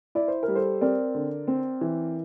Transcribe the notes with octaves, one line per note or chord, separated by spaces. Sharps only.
E4 D5
C5
A#4
G3
A4 C5
C4 A#4 D5
D3
C4
E3